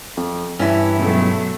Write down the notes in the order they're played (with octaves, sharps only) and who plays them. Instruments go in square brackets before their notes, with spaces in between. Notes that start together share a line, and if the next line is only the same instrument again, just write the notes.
[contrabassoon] F2
[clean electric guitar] G2 [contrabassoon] E3 [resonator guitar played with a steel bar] C#4 E4
[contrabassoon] C#2 [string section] B2 F#3 A3